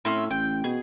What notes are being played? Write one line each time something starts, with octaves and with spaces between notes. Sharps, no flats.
A2 C4 C#4 E5
A1 G5
B2 G#4